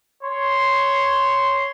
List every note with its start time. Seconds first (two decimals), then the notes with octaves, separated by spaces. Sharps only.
0.23 C#5 C6